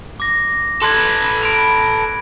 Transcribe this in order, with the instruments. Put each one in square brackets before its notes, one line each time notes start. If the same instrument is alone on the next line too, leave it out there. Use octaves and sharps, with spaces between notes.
[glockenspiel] D6 A#6
[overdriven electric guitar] A4 B4 [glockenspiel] C6 F#6 G#6
[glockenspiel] B5 D7